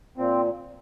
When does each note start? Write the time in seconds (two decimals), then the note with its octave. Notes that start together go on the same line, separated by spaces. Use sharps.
0.17 A#2 C4